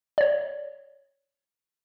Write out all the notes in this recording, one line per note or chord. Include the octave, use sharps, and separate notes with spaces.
C#5 D5